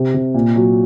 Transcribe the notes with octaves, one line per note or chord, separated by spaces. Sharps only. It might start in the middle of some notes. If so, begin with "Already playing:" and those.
Already playing: C3
C3
A#2
F#3